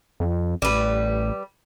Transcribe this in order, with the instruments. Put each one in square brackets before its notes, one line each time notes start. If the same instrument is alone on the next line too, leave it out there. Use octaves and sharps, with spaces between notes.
[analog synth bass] F2
[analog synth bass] A1 [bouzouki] G3 B4